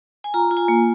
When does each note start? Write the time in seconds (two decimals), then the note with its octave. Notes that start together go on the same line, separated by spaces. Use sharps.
0.24 G#5
0.34 F4 A#5
0.51 F4
0.57 G#5
0.68 A#3